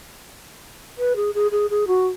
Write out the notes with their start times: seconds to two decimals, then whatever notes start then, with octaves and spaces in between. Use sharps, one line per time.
0.98 B4
1.16 G#4
1.34 G#4
1.51 G#4
1.70 G#4
1.87 F#4